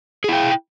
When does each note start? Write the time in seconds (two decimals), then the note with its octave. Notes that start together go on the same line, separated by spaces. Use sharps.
0.24 G#4
0.28 E4
0.33 G5